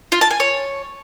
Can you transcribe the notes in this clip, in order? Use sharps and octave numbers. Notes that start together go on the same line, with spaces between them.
F4
A5
G#5
C#5